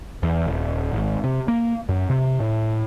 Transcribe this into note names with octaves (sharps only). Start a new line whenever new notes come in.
E2
D#1
G#1
C3
A#3
F#2
C3
A2